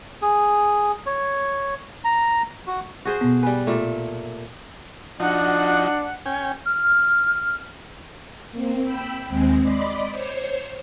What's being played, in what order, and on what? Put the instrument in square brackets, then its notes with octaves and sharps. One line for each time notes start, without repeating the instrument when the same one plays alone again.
[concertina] G#4
C#5
A#5
F#4
[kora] F#4 G#4 C5
[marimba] B2 B3
[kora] G3 B4 [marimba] G#5
[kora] A#2 A3
[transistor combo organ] F3 D#4 F#4 [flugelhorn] D4 [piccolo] F#5
[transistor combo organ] C#4 G5 G#5
[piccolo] F6
[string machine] A#3 C4
G5 B5 E6
D#2 G#3 C4
D5 D#5 B5 C6 D6
C5 C#5